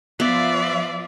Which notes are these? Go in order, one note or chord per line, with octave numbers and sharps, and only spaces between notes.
F3 B3 F4 D5 E5